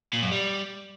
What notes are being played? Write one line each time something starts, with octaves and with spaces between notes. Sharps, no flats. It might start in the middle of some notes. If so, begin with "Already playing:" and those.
A#2
F#2
G3